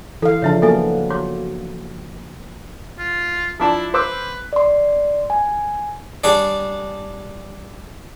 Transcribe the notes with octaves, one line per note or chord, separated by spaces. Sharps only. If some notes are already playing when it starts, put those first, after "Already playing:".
E3 A4 F5
C#3 F3 D4 C#5 E5 A5
F#3 A#3 B3 A4 E5 G#5
F#4 C#5 D6
F4
F3 D4 E4 A5
B4 C5 D6 E6
D5 C6
G#5
G3 D4 G#4 C#5 D5